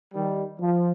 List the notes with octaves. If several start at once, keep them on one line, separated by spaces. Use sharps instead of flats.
D#3 G3
F3